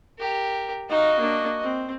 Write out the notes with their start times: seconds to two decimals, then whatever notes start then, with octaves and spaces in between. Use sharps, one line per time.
0.18 G4 A#4
0.90 D#4 F#4 D#5 F5
1.19 A#3 D4
1.62 C4